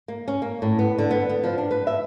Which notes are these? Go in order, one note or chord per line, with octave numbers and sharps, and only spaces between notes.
A#3
C#4
A#3
A2
B3
D3
B3
B3
F3
D4
B4
E5